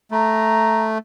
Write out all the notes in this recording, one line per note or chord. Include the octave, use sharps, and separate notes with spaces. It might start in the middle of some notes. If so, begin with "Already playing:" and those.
A3 A#5